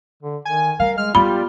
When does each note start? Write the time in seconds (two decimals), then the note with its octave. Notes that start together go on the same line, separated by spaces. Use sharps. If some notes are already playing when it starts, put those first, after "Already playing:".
0.23 D3
0.45 D#3 G#5
0.80 G3 A#4 F5
0.98 G#3 F6
1.15 G3 B3 F4 B5